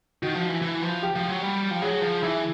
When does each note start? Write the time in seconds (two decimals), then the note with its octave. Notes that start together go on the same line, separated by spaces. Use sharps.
0.22 D#3 F#4
0.35 F3
0.49 E3
0.62 E3
0.82 F3
1.02 G4
1.16 F3
1.29 F#3
1.42 G3
1.71 F3
1.82 F#3 G#4
2.02 F3
2.22 E3 E4